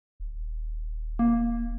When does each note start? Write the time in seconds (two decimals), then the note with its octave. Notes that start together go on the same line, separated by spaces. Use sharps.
0.20 D#1
1.19 A#3